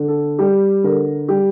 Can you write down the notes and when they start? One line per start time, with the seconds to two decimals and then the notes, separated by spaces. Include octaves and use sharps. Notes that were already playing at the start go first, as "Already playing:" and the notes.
Already playing: D3
0.08 A4
0.39 G3 G4
0.84 D3 A#4
1.29 G3 G4